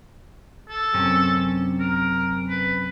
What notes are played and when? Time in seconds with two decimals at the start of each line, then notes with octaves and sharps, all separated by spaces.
0.70 A4
0.94 F#2 C3 C#4
1.80 A#4
2.49 B4